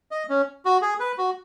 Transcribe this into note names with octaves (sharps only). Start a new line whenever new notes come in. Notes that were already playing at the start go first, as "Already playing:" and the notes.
D#5
C#4
F#4
G#4
B4
F#4